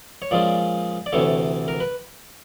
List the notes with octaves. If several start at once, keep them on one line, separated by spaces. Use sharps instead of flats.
C#5
A#2 F3 G#3 C#4 D5
D5
D2 C3 E3 A3 C#5
A#4
B4